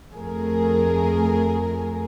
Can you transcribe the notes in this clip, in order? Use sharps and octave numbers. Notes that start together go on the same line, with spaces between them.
F2 A3 G#4 A#4